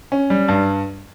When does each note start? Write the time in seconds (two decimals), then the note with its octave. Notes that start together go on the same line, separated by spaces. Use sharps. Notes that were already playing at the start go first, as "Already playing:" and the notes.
0.12 C#4
0.30 G3
0.48 G2